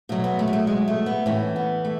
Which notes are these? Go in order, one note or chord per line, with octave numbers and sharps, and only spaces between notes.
B2 F#3 A3
B3
A3
G#3
A3
G#3
A3
B3
A2 E3 C#4
B3
A3